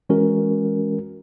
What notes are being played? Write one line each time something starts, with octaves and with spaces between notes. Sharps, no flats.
E3 G#3 C#4 F#4 A#4